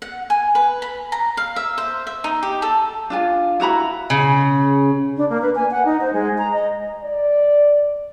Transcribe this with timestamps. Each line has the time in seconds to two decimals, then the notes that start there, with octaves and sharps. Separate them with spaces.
0.02 F#5
0.30 G#5
0.55 B4
0.82 B5
1.12 A#5
1.37 F5
1.56 E5
1.78 C5
2.07 E5
2.24 D#4
2.43 G4
2.62 A4
3.10 D4 F4 G#5
3.60 E4 F#4 A#5 B5
4.10 C#3
5.17 D4
5.29 A#3
5.42 B4
5.55 G#5
5.71 F#5
5.85 D#4
6.01 C5
6.13 G#3
6.38 A#5
6.53 D#5
7.03 D5